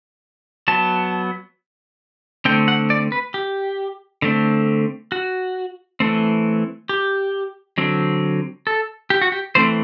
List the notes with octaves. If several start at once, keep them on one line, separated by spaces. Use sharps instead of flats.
F#3 B3 A5
D3 A3 C4 G5
F#5
D5
B4
G4
D3 A3 C4
F#4
E3 A3 C4
G4
D3 F#3 C4
A4
G4
F#4
G4
E3 A3 C4 C5